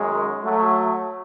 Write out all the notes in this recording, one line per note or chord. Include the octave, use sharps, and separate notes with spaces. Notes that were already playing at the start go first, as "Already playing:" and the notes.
Already playing: F#2 D#3 G#3
F#3 A3